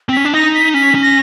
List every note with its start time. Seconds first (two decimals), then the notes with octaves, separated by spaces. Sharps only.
0.09 C4
0.13 C#4 B6
0.25 D4
0.34 D#4 A#6
0.54 B6
0.74 C#4 B6
0.95 C#4
1.02 A#6